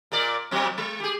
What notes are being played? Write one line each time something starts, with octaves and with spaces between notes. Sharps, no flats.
A#2 A#4 D5
A#2 F#3 C4
G#3
G4 G#4